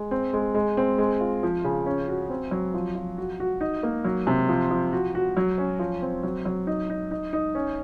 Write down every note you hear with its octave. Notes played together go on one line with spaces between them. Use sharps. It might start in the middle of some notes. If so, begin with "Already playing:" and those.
Already playing: G#3
C4
G#3
G#3
C4
G#3
F4
F3
C#3
C#4
F#4
C4
F#3
F3
F3
F#4
F#4
D#4
A#3
F#3
C3
F3
F3
F#4
F#4
F#3
C#4
F3
C4
F#3
F#3
D#4
D#4
D#4
D#4
C#4